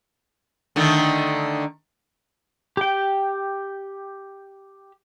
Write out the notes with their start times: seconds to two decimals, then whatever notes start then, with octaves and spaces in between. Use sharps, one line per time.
0.76 D3 D#3 A3
2.77 G4 G5